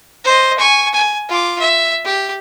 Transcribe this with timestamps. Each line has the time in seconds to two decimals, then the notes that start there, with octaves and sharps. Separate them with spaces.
0.24 C5 D#5
0.58 G#5 C#6
0.93 G#5
1.29 F4 D6
1.59 E5
2.05 G4